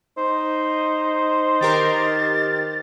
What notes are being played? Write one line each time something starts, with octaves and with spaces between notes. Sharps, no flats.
D#4 C5
D#3 G4 A#4 A6